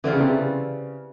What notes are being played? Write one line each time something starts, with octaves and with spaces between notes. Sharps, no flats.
D3 E3 G3 C4 F4
C#3
C3
C#3